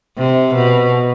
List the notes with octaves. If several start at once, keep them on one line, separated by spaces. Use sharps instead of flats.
C3
B2